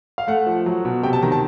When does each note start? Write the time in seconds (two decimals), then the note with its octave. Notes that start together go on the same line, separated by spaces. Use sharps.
0.18 F5
0.27 A3 F#5
0.47 F3
0.66 F#3
0.85 B2
1.03 C3 G5
1.13 A5
1.22 D#3 A#5
1.32 A5